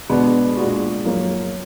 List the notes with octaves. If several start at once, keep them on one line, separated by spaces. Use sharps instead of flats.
B2 G#3 B3 D4
A#2 G#3 D4 F#4
F#2 F3 A#3